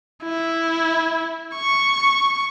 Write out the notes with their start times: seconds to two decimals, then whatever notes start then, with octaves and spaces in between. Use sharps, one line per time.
0.23 E4
1.55 C#6